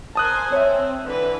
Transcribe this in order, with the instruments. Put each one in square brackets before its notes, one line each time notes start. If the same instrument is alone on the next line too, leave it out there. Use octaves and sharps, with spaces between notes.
[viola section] A#4 C5 G#5 [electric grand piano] A5 D#6 F#6
[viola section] C4 [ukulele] C#5 E5
[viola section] D3 E3 B4